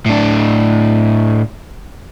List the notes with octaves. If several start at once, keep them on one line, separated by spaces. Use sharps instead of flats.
A2 D4